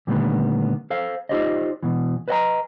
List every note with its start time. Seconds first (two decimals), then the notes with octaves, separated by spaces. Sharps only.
0.07 A#2 D3 D#3 G3 A3 B3
0.90 A4 C5 F5
1.29 D#4 F4 G4 C5 D5 D#5
1.83 E2 G#2 B2 E3
2.28 B4 C5 D#5 F#5 G#5 A#5